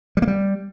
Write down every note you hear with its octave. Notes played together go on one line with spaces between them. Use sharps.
G3
A#3
G3